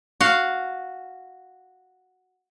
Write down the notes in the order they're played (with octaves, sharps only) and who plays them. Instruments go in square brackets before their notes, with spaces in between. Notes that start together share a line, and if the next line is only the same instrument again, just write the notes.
[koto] F#4 F5